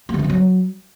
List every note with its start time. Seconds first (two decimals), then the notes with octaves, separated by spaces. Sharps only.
0.09 A#3
0.14 D3
0.19 A3
0.24 B3
0.30 F#3